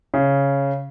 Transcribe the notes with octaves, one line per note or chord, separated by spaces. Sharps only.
C#3